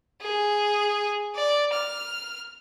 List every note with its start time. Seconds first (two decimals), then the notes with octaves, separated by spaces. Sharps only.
0.22 G#4
1.35 D5
1.73 F6